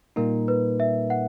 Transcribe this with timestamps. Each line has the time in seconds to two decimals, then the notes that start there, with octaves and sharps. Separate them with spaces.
0.16 A#2 G3 A#3 D#4 A#4
0.48 B4
0.80 E5
1.10 F#5